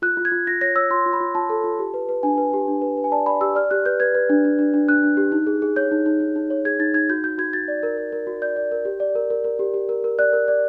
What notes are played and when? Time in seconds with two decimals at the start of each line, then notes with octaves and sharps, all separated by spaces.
0.02 F4 F#6
0.17 F4
0.25 G#6
0.32 F4
0.47 F4 A#6
0.61 C#5 A#6
0.76 C#5 E6
0.91 F4 C6
1.06 F4
1.13 B5
1.21 F4
1.35 F4 A5
1.50 A4
1.64 F4
1.79 G4
1.94 B4
2.09 B4
2.23 D4 G#5
2.38 B4
2.53 G4
2.68 D4
2.82 B4
2.97 B4
3.04 G#5
3.12 D5 A5
3.26 D5 B5
3.41 G4 E6
3.55 D5 F6
3.71 G4 F#6
3.86 B4 G6
4.00 B4 G#6
4.15 B4
4.29 D4
4.45 D4
4.59 D4
4.74 D4
4.88 D4 F#6
5.03 D4
5.17 G4
5.32 D#4
5.47 G#4
5.62 G#4
5.76 C#5 G6
5.91 D#4
6.06 D#4
6.20 D#4
6.36 D#4
6.50 C#5
6.65 G#4 G#6
6.80 D#4 A6
6.94 D#4 G#6
7.10 F#4 G6
7.24 F#4 G6
7.38 F#4 G#6
7.53 F#4 A6
7.68 D5
7.83 A#4
7.98 A#4
8.12 A#4
8.27 F#4
8.42 D5 G6
8.56 D5
8.72 A#4
8.85 G4
9.00 D5
9.15 A#4
9.30 A#4
9.44 A#4
9.59 G4
9.74 G4
9.89 A#4
10.04 A#4
10.19 D5 F#6
10.33 A#4
10.48 D5